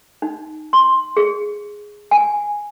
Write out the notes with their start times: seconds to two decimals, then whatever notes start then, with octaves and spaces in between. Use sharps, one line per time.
0.22 D#4
0.73 C6
1.17 G#4
2.11 G#5